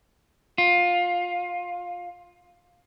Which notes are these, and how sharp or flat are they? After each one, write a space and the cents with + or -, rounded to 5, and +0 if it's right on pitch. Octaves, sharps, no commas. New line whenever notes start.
F4 +15